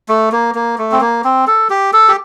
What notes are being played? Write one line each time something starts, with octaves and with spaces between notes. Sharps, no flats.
A3
A#3
A#3
A3
C4
A#3
C4
A4
G4
A4
G4